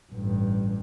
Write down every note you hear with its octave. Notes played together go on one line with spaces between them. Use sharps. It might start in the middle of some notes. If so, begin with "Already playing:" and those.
A1 G2